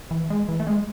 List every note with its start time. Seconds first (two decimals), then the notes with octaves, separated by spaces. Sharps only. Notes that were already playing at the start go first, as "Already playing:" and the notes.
0.11 E3
0.30 G#3
0.49 E3
0.60 A3
0.67 G#3